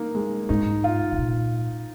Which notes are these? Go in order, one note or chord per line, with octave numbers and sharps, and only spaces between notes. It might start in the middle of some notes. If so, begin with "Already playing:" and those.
Already playing: A#3 D#4
G#3
G#2 D#4
F4
C3
A#2